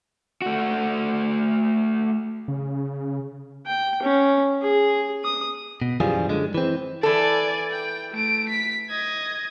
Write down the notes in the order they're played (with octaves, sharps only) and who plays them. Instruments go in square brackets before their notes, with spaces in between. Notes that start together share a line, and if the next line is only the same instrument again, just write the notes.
[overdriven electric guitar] A3 F#4
[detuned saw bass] C#3
[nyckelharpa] G5
C#4
G#4
D#6
[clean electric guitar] B2
F#2 E3 F3 G3 F4 G#4
F#2 D3 G#3
E3 C4
[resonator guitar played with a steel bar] E3 A4 [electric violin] D5 G#5
[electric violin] G5
A3 D7
B6
D#5 G#6